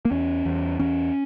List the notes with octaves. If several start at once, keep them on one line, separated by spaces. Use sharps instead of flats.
A#3
E2 C#4
E2
E2 C#4